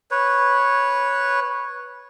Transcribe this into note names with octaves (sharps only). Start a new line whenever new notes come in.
B4 C#5